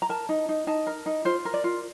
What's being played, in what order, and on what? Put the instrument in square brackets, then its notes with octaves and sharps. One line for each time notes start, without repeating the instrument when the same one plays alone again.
[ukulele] A#5
A#4 A5
D#4
D#4
D#4 A5
A#4
D#4
F4 C5
A#4
D5
F4